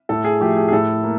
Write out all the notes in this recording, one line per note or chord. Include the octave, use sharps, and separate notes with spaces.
A2 A4
G#4
F3 A3 G4
G#4
G#4
A2 A4
A#3